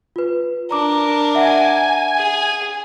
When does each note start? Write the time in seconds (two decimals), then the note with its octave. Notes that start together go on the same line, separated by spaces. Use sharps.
0.16 F4 B4
0.71 D4 A#4 A#5 D6
1.35 E5 F#5 G#5
2.18 G#4